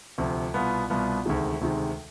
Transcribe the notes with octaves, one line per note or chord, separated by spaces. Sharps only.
D2 C3 F3
C2 B2 B3 F4
C2 B2 B3 F4
D2 C3 D#3 G#3
D2 C3 D#3 G#3